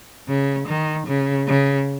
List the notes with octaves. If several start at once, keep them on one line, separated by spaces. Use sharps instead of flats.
C#3
D#3
C#3
C#3